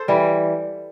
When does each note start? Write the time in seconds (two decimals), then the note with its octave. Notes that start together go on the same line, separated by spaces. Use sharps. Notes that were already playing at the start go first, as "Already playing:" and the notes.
Already playing: A4 C5
0.08 E3 G3